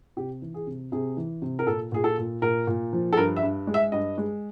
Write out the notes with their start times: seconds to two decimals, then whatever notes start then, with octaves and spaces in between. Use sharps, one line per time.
0.17 C3 G4
0.42 E3
0.54 G#4
0.67 C3
0.92 C3 G#4
1.17 E3
1.42 C3
1.59 A#4
1.67 A#2 A4
1.92 A#2 G#4
2.04 A4
2.18 A#2
2.42 A#2 A#4
2.67 A#2
2.93 F3
3.13 A4
3.17 G2 A#4
3.36 E5
3.43 G2
3.67 G#3
3.74 E5
3.92 G2 D#5
4.18 G#3